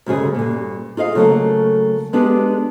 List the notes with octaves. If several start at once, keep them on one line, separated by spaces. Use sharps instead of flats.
D2 G2 C#3 G#3 G#4
G2 A#2
F4 G#4 D#5 F5
C#3 F#3 A3 A#3
G#3 B3 D4 G4 G#4